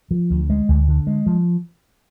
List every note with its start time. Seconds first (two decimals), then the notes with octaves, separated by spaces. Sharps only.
0.11 F3
0.30 D2
0.50 G#3
0.69 D2
0.89 D3
1.07 G#3
1.26 F3